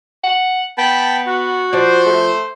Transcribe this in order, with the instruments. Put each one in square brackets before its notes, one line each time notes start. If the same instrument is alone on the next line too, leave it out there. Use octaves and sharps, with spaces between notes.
[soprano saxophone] F#5
[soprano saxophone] B3 [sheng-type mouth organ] G5 A5 B5
[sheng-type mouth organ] F#4
[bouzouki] F3 D5 [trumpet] C5
[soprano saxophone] A3